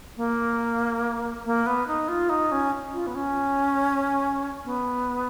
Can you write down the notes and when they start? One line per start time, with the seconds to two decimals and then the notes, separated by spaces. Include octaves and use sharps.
0.17 A#3
1.45 A#3
1.66 B3
1.87 D#4
2.09 F4
2.29 D#4
2.52 C#4
2.93 F4
3.07 B3
3.15 C#4
4.65 B3